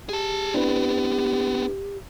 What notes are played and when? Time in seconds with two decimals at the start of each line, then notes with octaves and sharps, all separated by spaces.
0.09 G4 G#4 A5
0.54 B3 C4 D4 E4 B4